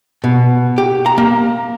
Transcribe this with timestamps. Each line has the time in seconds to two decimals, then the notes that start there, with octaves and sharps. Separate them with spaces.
0.24 B2
0.78 G4
1.06 A#5
1.18 A#3